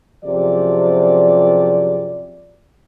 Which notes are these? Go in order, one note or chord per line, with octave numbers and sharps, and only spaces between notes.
F#2 C3 F3 G4 G#4 D5